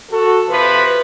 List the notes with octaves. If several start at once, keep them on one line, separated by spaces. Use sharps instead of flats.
F#4 A4
C3 F3 B4